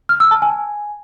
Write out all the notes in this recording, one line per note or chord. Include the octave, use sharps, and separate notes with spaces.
F6
E6
A5
G#5